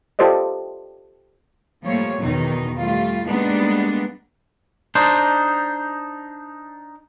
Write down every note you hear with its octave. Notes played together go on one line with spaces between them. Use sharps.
F4 G4 A4 C5 D5 D#5
F3 G3 A3 A#3 C#5
E2 B2 D#3 D#4
G3 A3 F4
G3 G#3 A#3 B3 D4 D#4
D4 D#4 C5